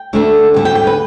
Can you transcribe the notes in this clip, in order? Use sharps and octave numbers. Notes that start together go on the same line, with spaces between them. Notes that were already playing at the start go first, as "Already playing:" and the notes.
Already playing: G5
D2 D3 A3 D4
D2 D3 G3
G5
G5
B4